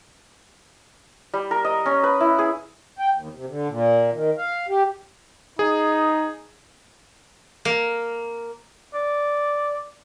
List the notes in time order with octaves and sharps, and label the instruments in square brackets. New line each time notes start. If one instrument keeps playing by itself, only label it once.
[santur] G3
A#4
D#5
C#4
B4
E4
G#4
[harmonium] G5
D#2
C3
D3
A#2
D#3
F5
G4
[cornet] D#4 [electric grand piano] G#4
[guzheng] A#3
[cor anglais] D5